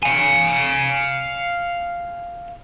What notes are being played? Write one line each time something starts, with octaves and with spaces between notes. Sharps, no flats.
F5 G#5